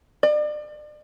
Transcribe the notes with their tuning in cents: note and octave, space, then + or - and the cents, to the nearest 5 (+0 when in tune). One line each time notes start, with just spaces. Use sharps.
D5 +35